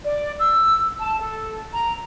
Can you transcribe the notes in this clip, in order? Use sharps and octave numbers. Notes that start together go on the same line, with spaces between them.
D5
E6
A5
A4
A#5